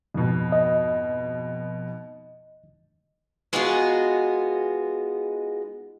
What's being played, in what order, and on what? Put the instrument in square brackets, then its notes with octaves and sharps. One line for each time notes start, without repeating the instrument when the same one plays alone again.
[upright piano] F2 G#2 B2
[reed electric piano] D#5
[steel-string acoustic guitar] G#3 B3 D#4 F4 F#4 G#4